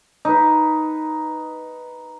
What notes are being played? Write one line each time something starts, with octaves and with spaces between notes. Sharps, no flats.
D#4 B4